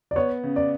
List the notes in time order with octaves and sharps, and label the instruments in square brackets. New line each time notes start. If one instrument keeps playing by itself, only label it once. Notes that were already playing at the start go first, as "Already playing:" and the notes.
[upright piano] D5
[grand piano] B3 [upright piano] C#5
[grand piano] C#3
[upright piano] D5